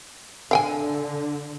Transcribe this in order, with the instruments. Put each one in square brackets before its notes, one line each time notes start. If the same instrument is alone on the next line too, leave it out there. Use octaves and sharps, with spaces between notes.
[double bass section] D3 [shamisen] F5 G5 G#5